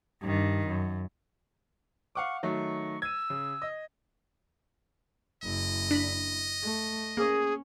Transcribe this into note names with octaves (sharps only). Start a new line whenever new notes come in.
G2 D#3
F#2
F5 F#5 C#6 D6
D#3 F#3 A3 C#6
E6 G#6 D#7
C#3
D#5
F#1 E4 D#5
D4 B5
A3
A#3 C#4 G#4